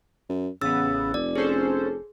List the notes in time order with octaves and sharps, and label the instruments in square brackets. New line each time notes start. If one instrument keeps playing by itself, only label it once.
[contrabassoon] F#2
[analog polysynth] A1 B3 [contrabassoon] C#3 [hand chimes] E6 A6
[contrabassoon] F1 [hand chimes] D5
[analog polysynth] C#4 A4 C5 [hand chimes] G#4